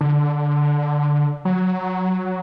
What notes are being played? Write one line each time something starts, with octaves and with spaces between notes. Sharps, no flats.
D3
F#3